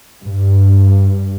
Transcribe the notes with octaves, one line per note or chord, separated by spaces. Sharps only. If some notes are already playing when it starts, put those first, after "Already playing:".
G2